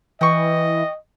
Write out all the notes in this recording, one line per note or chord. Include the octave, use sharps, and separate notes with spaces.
E3 D#5 G5 C#6